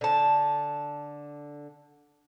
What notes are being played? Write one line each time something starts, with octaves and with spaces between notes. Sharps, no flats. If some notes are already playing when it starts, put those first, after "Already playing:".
D3 A5